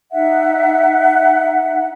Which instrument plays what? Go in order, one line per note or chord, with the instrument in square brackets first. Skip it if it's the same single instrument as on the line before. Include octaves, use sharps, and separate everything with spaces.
[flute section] D#4 E5 F#5